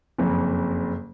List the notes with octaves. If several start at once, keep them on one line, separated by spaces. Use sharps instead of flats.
F#1 F2